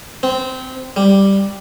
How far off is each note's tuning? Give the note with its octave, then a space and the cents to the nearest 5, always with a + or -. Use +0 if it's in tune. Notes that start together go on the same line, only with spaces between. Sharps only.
C4 -15
G3 +0